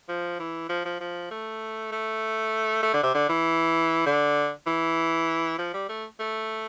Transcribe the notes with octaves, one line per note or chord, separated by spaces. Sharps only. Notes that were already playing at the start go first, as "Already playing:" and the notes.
F3
E3
F3
F3
F3
A3
A3
A3
D3
C3
D3
E3
D3
E3
F3
G3
A3
A3